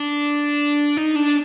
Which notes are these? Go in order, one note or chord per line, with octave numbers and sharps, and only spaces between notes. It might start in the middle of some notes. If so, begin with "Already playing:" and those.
Already playing: D4
D#4
D4